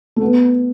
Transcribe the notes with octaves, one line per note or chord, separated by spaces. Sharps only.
A3
B3